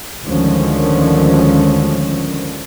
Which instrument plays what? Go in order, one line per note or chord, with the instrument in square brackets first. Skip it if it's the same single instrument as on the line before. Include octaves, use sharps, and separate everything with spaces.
[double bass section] D2 D3 D#3 F3 G#3 C#4